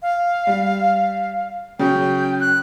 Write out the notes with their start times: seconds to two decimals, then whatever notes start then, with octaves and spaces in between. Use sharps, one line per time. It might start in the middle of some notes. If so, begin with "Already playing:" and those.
0.02 F5
0.47 G3
1.79 C#3 F#3 C#4 G5
2.41 F#6